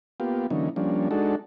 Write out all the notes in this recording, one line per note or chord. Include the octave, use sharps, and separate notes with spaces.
A#3 B3 F4 G4
D3 E3 F#3 A#3 C#4 D#4
F3 G3 A#3 C#4 D4
G#3 D4 D#4 F#4 A4